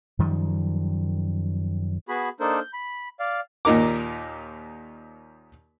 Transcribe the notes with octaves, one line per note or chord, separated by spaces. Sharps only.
F#2 D#3 F3 G3
B3 F#4 G#4 B5
A#3 D4 D#4 A4 A#4 C5
G6
B5
D5 F5
D#2 A#2 D#4 A#4 D6